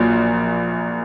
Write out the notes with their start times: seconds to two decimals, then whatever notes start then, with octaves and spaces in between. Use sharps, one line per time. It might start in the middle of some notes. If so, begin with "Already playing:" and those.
Already playing: A#1 A#2 F#3 A#3